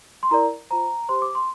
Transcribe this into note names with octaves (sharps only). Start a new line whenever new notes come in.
C6
E4 A#4 D5 A#5
F4 C5 A#5
G4 C5 C6
D6
C6